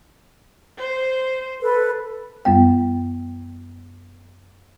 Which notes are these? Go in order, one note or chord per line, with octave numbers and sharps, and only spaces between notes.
C5
A4 B4
F#2 G3 B3 G5